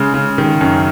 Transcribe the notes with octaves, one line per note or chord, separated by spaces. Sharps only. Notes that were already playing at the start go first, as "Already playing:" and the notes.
Already playing: C#3 G#3
C#3
D#3
F#2